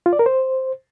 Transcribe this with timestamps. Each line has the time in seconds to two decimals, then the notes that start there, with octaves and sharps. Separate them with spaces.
0.06 F4
0.13 D5
0.19 A#4
0.26 C5